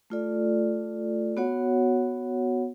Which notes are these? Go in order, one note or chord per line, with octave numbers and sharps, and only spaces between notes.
A3 F4 A4 D5
B3 F#4 C#5 F#5